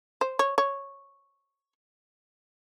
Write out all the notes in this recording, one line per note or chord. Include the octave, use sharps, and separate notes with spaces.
C5
C#5
C#5